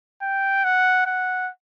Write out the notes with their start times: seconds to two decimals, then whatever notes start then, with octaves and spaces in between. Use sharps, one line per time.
0.22 G5
0.64 F#5
1.06 F#5